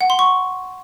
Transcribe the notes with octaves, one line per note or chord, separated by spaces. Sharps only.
F#5
C6
C#6